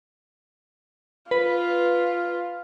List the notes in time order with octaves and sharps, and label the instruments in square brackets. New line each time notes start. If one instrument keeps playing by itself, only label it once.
[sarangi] F4 [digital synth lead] B4